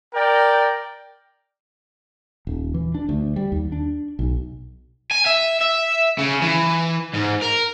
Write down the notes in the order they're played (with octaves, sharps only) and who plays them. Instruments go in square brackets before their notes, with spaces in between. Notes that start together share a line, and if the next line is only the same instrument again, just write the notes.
[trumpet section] A#4 D5 G5
[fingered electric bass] D#1
E3
D4
D2
G3
D#2
D4
B1
[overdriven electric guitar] G#5
E5
E5
C#3
E3
G#2
A#4